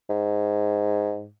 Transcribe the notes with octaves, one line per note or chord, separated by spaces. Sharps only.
G#2